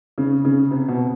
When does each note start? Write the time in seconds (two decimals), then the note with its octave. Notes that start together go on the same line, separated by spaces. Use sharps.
0.18 C#3
0.45 C#3
0.71 C3
0.88 B2